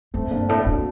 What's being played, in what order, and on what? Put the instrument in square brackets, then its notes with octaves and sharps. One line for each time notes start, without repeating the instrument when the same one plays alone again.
[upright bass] G2 [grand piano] A3 C4
[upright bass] G2 [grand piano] A#3 D4
[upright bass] A2 [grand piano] A#3 D4
[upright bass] A2 [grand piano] D4 F#4